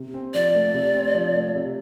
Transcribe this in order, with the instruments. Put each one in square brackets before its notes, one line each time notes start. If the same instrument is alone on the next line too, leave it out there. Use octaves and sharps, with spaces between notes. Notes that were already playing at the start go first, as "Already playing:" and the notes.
Already playing: [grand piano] C3
C4
[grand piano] F3 [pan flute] D5
[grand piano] A3
C3
C4
F3
A3
C3